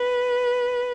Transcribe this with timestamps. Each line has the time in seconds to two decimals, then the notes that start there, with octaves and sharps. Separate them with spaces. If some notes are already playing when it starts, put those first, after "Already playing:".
Already playing: B4